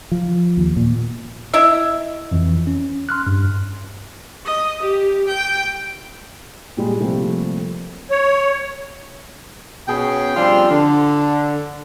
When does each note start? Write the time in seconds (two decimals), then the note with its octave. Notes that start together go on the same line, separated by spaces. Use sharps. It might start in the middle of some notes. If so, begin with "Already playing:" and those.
0.12 F3
0.57 D#2
0.77 A#2
1.54 E4 D#5 E5
2.31 F2 E3
2.67 C#4
3.09 C6 F6 F#6
3.27 G2
4.46 D#5
4.82 G4
5.28 G5
6.77 A#2 G3 G#3
7.00 C3 F3 G3 A3 A#3
8.10 C#5
9.88 B2 C#4 G#4 G5
10.36 F3 G3 C4 D4 F4
10.70 D3